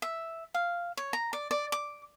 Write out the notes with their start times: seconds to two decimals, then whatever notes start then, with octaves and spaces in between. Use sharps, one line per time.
0.02 E5
0.54 F5
0.97 C#5
1.13 A#5
1.33 D5
1.51 D5
1.72 D6